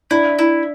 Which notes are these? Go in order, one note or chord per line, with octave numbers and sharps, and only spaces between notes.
D4 E4
E4